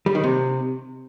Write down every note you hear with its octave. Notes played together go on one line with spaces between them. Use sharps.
G3
D#3
C3